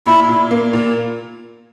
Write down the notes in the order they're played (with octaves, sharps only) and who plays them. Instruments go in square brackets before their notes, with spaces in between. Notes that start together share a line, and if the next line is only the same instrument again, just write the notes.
[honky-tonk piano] A#2 [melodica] E4
[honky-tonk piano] A#2
A#3
A#2